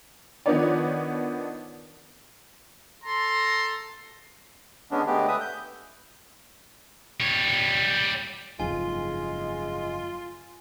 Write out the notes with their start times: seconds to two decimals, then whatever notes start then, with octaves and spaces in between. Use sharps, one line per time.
0.46 D#3 F3 B3 D4 C#5 D5
3.04 A4 A#5 C6
4.91 D3 G#3 B3 C#4 D4
5.06 D3 G#3 A3 B3 G4
5.28 B4 E5 D#6
5.41 G6
7.20 G3 C#5
8.60 F#1 F2 G#2 G#3 F4 G#5